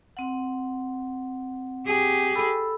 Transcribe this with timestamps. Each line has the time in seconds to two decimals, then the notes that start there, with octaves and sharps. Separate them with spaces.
0.17 C4 F#5
1.87 G4 G#4
2.35 A4 B5 E6